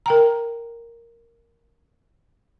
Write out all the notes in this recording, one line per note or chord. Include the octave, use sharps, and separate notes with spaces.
A#4 G5 A#5